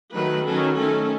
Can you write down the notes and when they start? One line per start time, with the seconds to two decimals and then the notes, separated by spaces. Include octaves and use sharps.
0.15 D#3 F#3 A3 B4
0.46 D#3 F#3 C#4 A4
0.78 D#3 A3 C#4 A4